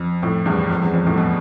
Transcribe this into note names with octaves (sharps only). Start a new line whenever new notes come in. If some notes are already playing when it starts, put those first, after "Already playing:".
Already playing: F2
F2 A2
E2 G2
F2
E2
F2
F2 A2
B2